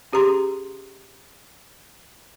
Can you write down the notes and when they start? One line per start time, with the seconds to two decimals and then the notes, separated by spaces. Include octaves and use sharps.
0.13 C#4 G4 G#4 A#5 C6